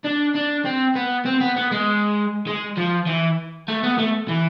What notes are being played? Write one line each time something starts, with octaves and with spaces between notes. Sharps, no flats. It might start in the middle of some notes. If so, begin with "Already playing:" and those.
D4
D4
C4
B3
C4
B3
B3
G#3
G#3
F3
E3
A3
B3
A3
E3